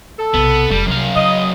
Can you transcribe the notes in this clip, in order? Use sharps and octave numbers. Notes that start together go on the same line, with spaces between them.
A4
B1 C3 B3
F1 G3
C2 F#2 F5
C#3 D#5